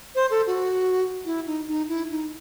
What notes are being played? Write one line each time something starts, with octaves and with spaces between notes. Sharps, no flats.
C5
A4
F#4
E4
D#4
D#4
E4
D#4